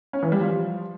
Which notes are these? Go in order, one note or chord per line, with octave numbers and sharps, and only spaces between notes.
C#4
E3
G3
F3